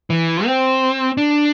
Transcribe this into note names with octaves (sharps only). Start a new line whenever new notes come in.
E3
C4
D4